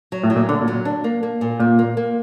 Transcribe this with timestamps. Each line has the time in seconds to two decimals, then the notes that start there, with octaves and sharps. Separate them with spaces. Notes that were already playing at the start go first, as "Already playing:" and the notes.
0.12 F#3
0.24 A2
0.30 F#3
0.36 A#2
0.49 D3 D4
0.61 A#2
0.68 F#3
0.73 A#2
0.85 D4
1.04 A#3
1.23 A#3
1.41 A#2
1.60 A#2 A#3
1.79 A#3
1.97 A#3